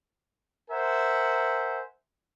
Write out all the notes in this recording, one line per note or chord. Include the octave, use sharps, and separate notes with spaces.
A#4 C5 E5 F#5 G#5